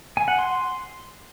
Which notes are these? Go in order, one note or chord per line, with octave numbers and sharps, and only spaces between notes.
G#5
F#5
C6